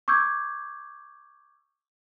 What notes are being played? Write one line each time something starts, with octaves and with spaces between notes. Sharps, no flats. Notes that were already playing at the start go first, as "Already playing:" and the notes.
C#6 D6 E6 G6 G#6